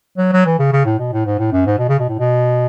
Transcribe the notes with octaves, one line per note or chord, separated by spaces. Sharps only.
F#3
F#3
E3
C#3
C#3
A2
B2
A2
G#2
A2
F#2
G#2
B2
C#3
B2
A2
B2